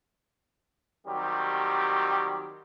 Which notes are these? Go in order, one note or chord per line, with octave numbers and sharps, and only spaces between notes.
D#3 F#3 G3 C4 G4